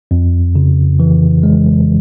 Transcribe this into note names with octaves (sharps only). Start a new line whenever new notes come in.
F2
C#3
E3
G#3